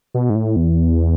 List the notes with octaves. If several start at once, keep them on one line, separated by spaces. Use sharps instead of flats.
B2
G#2
A2
E2